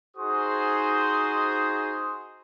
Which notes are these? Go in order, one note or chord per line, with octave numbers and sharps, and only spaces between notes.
D#4 F#4 G#4 C5 C6 D#6